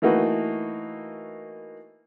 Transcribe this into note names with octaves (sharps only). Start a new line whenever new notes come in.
E3 A3 A#3 D#4 F#4 B4